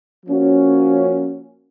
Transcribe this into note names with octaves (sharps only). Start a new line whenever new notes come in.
F3 A#3 C#4 F#4